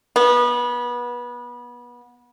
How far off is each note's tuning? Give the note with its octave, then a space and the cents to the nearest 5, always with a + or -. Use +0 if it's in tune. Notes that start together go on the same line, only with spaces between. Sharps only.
B3 -25